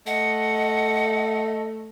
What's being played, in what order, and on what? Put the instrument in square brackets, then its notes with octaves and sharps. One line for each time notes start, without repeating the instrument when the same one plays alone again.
[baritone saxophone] A3 [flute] D#5 [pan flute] F#5